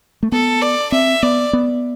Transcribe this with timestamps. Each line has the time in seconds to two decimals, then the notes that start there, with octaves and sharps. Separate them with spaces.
0.23 A3
0.32 B3 A4
0.62 D5
0.92 C4 E5
1.22 B3 D5
1.53 B3